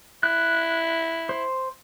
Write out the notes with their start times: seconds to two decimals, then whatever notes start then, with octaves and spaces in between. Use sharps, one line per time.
0.23 E4 F#6
1.29 C5